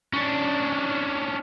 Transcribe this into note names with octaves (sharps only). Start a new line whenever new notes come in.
C#4 D4